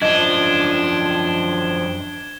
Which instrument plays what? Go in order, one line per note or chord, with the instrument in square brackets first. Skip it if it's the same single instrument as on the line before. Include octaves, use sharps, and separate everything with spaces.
[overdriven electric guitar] F#2 F3 [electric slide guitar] D4 [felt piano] D#5 [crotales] G#6 E7 G7